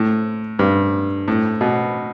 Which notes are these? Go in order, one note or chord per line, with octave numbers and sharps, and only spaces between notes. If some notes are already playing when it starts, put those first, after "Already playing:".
Already playing: A2
G2
A2
B2